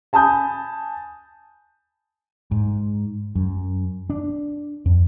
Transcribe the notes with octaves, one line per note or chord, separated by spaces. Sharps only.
G#5 A5 B5 D#6 G6
G#2
F#2
D4
F2